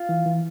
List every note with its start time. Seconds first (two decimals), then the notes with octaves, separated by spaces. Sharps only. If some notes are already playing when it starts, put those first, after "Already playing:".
Already playing: F4
0.09 E3
0.26 E3